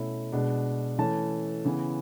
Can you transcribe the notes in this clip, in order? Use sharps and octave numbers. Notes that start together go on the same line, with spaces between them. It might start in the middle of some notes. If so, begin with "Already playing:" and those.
Already playing: B2 A3 C#4 E4
B2 G#3 D4
E3 A3 C#4 A5
C#3 E3 B3